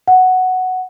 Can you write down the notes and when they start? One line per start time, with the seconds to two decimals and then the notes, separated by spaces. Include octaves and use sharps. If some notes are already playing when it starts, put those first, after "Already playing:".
0.08 F#5